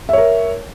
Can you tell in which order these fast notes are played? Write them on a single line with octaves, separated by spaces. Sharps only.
E5 C#5 A#4